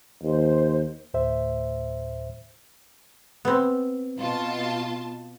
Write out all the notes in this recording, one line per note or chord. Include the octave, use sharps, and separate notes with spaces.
D#2 C5
D2 A2 C5 E5
B3 C4
B2 F4 A5